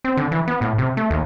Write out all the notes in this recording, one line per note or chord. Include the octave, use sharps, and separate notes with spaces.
C4
D3
E3
B3
A2
C3
A3
D#2